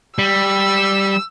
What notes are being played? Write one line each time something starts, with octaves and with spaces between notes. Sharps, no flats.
G3 E6